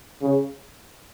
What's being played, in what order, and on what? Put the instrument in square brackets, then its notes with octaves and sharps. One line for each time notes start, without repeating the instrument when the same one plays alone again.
[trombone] C#3